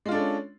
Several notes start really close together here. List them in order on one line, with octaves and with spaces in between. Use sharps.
G#3 F4 D4 A4 C#4